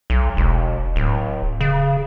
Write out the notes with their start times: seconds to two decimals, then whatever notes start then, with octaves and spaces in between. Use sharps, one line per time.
0.10 B1
0.37 E1
0.96 D1
1.61 C#3